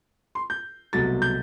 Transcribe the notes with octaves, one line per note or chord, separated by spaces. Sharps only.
C6
G6
C2 B2 F#3 A3 A6
G6